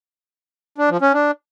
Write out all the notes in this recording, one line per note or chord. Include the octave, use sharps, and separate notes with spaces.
D4
F3
C#4
D4